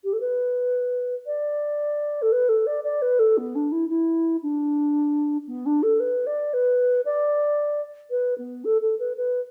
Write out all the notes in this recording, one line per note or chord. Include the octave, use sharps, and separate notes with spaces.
G4
A4
B4
D5
A4
B4
A4
D5
D5
B4
A4
B3
D4
E4
E4
D4
B3
D4
A4
B4
D5
B4
D5
B4
B3
A4
A4
B4
B4